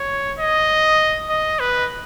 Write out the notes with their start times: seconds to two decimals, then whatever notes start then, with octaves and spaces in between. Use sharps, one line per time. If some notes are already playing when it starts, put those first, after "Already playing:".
Already playing: C#5
0.39 D#5
1.29 D#5
1.59 B4